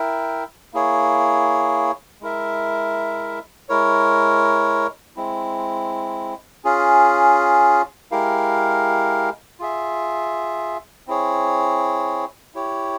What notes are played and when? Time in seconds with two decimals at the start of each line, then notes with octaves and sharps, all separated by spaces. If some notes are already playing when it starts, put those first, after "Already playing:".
Already playing: E4 A#4 E5 G5
0.73 A#3 E4 G#4 C#5
2.21 G#3 E4 A#4 E5
3.69 G#3 E4 A#4 C#5
5.17 G#3 C4 E4
6.64 C#4 F4 G#4
8.11 G#3 E4 G4 A#4 F5
9.59 F4 G#4 E5
11.07 C4 E4 G#4 C#5
12.55 E4 G4 C#5